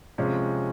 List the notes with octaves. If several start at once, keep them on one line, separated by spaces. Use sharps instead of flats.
C3 F3 G#3 C#4